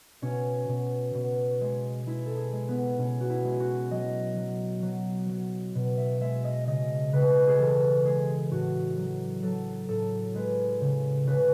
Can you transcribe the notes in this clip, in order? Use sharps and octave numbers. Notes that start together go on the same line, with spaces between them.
B2 C#4
B2
B2
G#3
G#3 E4
A4
G#4
G#3
B3
B2 C#4
F#4
E4
G#3
F#4
F#3 D#5
F#3
F#3
F#3
B2
E5
G#3 E5
D#5
C#3 D#5
C#3 B4
G#4
E3 A4
G#3 G#4
A2 F#4
F#3
F#3 A4
A2 A4
G#3 B4
C#3
C#3 B4